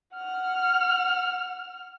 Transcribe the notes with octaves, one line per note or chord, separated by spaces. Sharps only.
F#5 F6